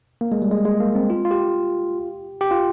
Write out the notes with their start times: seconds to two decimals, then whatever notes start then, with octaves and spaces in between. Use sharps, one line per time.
0.21 A#3
0.32 G#3
0.42 G3
0.51 G#3
0.65 G#3
0.80 A#3
0.95 C4
1.10 F4
1.25 F4
1.31 G4
2.41 G4
2.51 F4